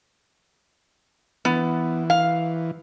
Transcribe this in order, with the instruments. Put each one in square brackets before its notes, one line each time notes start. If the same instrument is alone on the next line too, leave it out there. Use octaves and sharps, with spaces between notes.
[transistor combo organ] E3 [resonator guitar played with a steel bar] B3
[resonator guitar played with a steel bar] F5